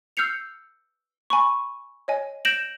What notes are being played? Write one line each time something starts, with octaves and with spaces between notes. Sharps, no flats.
E6 F6 G6 C7 C#7 F7
G#5 B5 C#6
C#5 D#5 G#5
G6 A#6 D7 E7 F#7